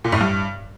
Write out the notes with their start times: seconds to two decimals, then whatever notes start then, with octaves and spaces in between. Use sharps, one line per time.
0.04 A#2
0.12 A2
0.20 G2